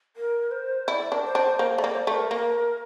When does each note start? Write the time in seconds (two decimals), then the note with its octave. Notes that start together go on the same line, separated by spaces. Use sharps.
0.16 A#4
0.51 C5
0.87 E4 D5
1.12 D4 A#4
1.24 C5
1.35 D4
1.59 A#3 C5
1.78 A3 D5
1.84 A#3
1.95 C5
2.06 A3 C5
2.14 A#4
2.31 A#3 A#4